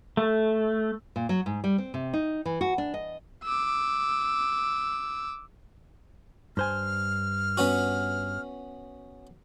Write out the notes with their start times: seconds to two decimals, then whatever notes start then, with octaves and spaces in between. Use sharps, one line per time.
0.17 A3
1.16 A#2
1.29 F#3
1.46 G#2
1.64 G3
1.78 C4
1.94 C3
2.13 D#4
2.45 E3
2.61 F#4
2.78 D4
2.94 D#5
3.43 D6 E6
6.57 G2 C5 G#5 F6
7.57 B3 C#4 F#4